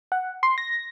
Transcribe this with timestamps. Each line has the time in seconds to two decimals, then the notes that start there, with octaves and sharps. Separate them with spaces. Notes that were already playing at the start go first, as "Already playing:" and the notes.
0.12 F#5
0.43 C6
0.58 A#6